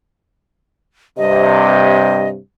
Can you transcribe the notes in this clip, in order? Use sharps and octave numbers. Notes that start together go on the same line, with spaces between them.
G2 C3 D#5